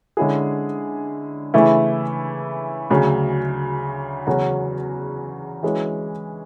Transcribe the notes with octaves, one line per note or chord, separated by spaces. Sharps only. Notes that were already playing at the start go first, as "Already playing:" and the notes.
D3 G#3 C#4 E4 G#4
C#3 E3 A3 E4
D2 C#3 F#3
E2 C#3 F#3 C#4 F#4
E3 G#3 C#4 F#4